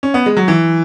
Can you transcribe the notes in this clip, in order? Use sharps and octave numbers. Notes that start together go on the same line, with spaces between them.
C#4
B3
G#3
F#3
E3